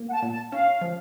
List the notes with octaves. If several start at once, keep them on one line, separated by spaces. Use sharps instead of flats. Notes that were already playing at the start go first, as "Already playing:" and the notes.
Already playing: A#3
F#5
A5
A#2
A5
C#4 F5
F3